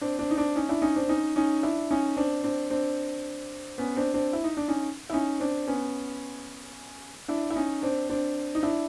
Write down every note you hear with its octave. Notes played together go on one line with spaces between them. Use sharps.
C4 D4
C4 D4
D#4
C4 D4
C#4 D#4
D4 E4
C#4 D#4
C4 D4
C#4 D#4
C#4 D#4
D4 E4
C#4 D#4
C4 D4
C4 D4
C4 D4
B3 C#4
C4 D4
C4 D4
E4
D#4
D4
C#4 D#4
E4
C#4 D#4
C4 D4
B3 C#4
D4 E4
E4
C#4 D#4
C4 D4
C4 D4
D#4
D4 E4